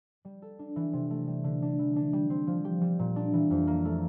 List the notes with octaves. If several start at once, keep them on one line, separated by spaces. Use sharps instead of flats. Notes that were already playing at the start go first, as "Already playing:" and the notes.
G3
A4
D4
E3
C3
A3
G3
D3
D4
E3
D4
G3
C4
F3
G4
G3
A#2
D4
E3
F2
A#3
A3